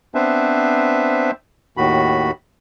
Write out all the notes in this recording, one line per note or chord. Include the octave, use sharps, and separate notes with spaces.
B3 C4 D4 B4 C5 E5
D#2 A2 D#3 F#4 B5